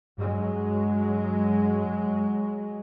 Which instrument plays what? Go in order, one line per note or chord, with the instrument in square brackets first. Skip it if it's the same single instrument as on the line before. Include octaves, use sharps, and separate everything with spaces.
[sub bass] G2 [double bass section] F#3 G#3